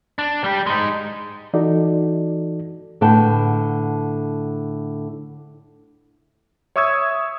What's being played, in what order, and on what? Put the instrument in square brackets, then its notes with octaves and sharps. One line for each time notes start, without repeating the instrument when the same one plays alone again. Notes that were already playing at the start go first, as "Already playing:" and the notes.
[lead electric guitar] D4
G3 G4
G#3 D#4
[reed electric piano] E3 D#4 F#4 A4 D5
[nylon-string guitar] A2 D3 B4 F#5 G5 A5
[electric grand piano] C#5 E5 C#6 D#6 E6 G#6